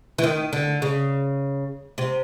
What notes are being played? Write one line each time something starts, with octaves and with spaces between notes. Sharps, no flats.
E3
D#3
D3
C#3
C3